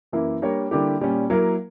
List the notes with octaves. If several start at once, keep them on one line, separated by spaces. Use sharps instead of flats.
F#2 E3 A#3 E4
G3 A#3 D4 A#4 C#5
D3 G3 A#3 E4 G4
A#2 G3 C#4
F#3 A#3 E4 A#4